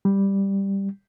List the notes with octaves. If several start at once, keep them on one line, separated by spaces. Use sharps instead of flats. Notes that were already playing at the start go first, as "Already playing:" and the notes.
G3